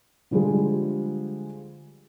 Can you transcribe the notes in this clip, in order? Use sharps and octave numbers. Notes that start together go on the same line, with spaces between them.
D3 F3 G3 G#3 G#4